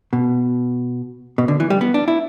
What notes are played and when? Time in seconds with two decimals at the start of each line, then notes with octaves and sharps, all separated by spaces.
0.13 B2
1.38 B2
1.48 D3
1.60 E3
1.70 G3
1.81 B3
1.94 D4
2.08 E4